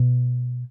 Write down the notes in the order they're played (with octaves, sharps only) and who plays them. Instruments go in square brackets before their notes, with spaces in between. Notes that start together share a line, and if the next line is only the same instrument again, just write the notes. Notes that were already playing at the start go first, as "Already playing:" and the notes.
Already playing: [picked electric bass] B2